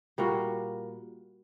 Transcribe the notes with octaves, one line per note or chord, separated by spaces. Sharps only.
A#2 G3 A#3 F#4